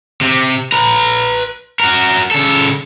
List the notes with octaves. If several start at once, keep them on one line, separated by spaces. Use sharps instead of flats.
C3
B4 A#5
F#4 A#4
C#3 A4